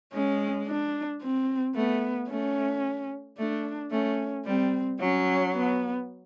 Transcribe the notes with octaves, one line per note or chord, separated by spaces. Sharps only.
G#3 C#4
D4
C4
A3 B3
A3 C#4
A3 D4
A3 C#4
G3 C4
F#3 C#4
B3